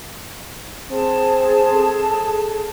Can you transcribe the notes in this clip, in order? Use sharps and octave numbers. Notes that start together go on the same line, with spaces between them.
C4 G#4 A5
A4